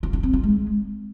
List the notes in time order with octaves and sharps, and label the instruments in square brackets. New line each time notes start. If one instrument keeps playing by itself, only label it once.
[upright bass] F4
D4
C4
F4
G#3